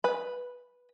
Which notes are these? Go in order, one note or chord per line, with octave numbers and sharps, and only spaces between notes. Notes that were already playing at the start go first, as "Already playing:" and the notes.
B4 B5